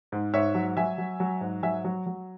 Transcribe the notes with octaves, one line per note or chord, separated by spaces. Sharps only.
G#2
G#2 C#5 E5
F#3
F#3 E5 G#5
F#3
F#3
G#2
F#3 E5 G#5
F#3
F#3